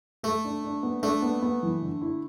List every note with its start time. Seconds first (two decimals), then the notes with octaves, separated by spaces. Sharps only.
0.23 A3 A4
0.44 D4
0.64 D4
0.83 B3
1.03 A3 D4
1.22 B3
1.42 B3
1.63 E3
1.82 D3
2.02 E4